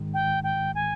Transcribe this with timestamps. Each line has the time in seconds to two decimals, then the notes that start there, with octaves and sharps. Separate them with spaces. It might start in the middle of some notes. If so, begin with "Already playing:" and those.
Already playing: G#2 D#3 G#3
0.14 G5
0.44 G5
0.75 G#5